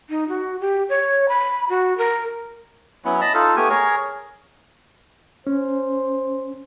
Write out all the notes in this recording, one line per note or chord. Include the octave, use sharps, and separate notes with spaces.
D#4
F#4
G4
C#5
B5
F#4
A#4
F#3 B3 C#4 E4
D#5 A5 B5
D#4 F4 A4
A3 B3 G4 G#5
G#4 A#4 C#5
C#4 C5